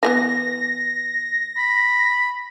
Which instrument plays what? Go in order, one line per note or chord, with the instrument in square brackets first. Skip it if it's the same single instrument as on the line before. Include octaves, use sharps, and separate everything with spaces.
[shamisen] E3 A3 B3 [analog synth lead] A#6
[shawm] B5